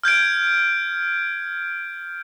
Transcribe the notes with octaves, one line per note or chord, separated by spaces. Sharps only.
F6 G6 G#6 D7